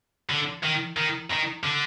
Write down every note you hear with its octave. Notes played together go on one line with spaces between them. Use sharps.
D3
D#3
D#3
D#3
D3